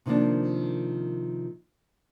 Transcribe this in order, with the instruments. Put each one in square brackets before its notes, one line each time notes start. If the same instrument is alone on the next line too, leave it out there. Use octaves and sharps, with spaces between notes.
[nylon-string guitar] C3 D#3 F3 A#3 D4